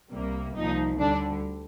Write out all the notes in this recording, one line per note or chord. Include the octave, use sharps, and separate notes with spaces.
C2 C3 G3 A#3
C2 A#2 F3 D#4
D2 D3 G3 D4